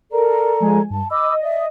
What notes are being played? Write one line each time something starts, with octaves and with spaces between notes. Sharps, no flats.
A4 A#4 D5 A#5
F3 G#3 G#5
G2 A5
D#5 B5 D6 E6
D5 E5